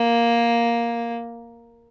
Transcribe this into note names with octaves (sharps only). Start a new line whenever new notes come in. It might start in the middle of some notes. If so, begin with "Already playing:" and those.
Already playing: A#3